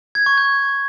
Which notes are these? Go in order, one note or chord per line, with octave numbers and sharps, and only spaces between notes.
G#6
C#6
G6